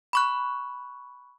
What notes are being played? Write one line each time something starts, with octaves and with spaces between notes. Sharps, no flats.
B5 C#6 F#6